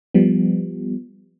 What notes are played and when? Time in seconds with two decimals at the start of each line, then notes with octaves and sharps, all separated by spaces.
0.14 F3 G3 B3